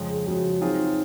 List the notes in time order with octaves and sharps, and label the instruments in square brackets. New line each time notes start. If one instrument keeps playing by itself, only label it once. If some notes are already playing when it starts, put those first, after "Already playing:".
Already playing: [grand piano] F2 C#3 G#3
[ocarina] G#4
[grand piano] F2 C#3 G#3 [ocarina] F#4
[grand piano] F#3 C4 F4 G#4 [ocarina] D#4